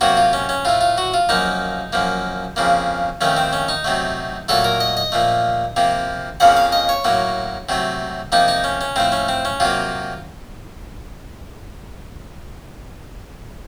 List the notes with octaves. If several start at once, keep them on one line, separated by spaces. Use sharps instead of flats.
C3 F#3 A#3 F#4
F4
C#4
C#4
A2 A3 F4
F4
F#4
F4
F#2 F3 A#3 D#4
F#2 F3 A#3
F2 C#3 F3 A#3
F2 D#3 A3 C#4
C4
C#4
D#4
C3 F#3 A3
A#2 F#3 A3 A4
A#4
D#5
D#5
A#2 F3 A3
C3 F3 A#3
F2 C#3 F3 A#3 F#5
F5
D#5
C#5
A2 F#3 A#3
C3 F#3 A3
C3 F3 A#3 D#4
D#4
C#4
C#4
A2 F3 A3 C4
C#4
C4
C#4
C3 F#3 A#3 F4